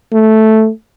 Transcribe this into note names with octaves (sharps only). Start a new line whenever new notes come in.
A3